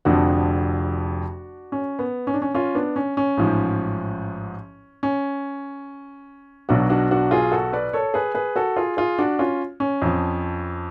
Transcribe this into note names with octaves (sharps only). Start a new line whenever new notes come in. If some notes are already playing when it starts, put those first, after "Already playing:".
F1 F2 D3 F3 D4 F#4
C#4
B3
C#4
D4
C#4
C#4 F4
B3 D4
C#4
C#4
A1 G#2 F3
C#4
B1 B2 F#3 D4 F#4
D4 F#4
D4 F#4
F4 G#4
F#4 A4
B4 D5
A4 C#5
G#4 B4
G#4 B4
F#4 A4
F4 G#4
F4 G#4
D4 F#4
C#4 F4
C#4
F2 F3